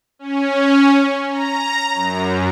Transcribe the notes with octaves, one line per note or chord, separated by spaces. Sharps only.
C#4
A#5
F#2